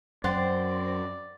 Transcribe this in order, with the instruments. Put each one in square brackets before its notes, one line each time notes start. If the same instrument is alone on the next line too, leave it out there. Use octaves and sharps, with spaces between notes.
[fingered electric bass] F#2 [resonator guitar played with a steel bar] C4 [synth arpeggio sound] C5 F#5 A6 [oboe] D5